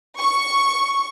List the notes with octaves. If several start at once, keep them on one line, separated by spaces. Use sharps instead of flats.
C#6